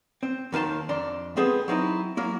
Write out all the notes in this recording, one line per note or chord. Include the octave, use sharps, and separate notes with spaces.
C4
D#2 D#3 B4 A5 C6
F2 D4 A#5 C6
G#3 B3 C4 G#4 A4
F#3 C4 D#4 E4
F#3 A#3 E4